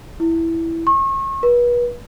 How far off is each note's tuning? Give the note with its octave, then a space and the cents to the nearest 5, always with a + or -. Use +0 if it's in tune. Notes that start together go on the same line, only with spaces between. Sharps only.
E4 +0
C#6 -35
B4 -35